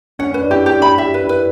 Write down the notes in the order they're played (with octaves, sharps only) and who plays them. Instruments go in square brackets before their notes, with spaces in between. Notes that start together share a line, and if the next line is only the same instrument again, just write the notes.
[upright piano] C#4 [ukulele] F#5
[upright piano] C#4 [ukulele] B4
[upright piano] D4
[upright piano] E4 [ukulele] G4
[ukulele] G4
[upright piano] D4
[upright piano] E4 [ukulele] B5
[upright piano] G4 [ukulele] E5
[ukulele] B4
[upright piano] E4
[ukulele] B4